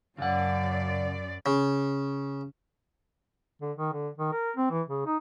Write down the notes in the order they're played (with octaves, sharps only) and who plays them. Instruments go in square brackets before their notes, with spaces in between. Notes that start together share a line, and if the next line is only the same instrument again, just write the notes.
[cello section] F#2 D5 [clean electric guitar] C#3 F#5
[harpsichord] C#3
[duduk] D3
D#3
D3
D#3
A#4
C4
E3
C#3
D#4